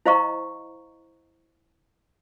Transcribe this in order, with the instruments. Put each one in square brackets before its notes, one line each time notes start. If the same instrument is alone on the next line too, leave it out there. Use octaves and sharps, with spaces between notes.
[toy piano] E4 C5 D#5 F5 A#5 C#6